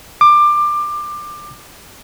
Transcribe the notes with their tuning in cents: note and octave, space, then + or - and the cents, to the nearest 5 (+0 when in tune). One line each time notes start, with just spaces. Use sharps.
D6 +20